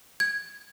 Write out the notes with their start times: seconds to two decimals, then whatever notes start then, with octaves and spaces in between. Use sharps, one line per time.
0.20 G#6